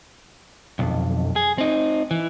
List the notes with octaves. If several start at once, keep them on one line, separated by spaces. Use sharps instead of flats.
B1 F2
G#4
C4 D#4
E3